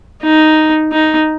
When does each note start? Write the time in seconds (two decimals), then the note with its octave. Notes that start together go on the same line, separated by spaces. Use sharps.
0.22 D#4
0.92 D#4